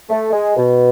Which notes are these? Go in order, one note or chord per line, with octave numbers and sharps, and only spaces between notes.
A3
G#3
B2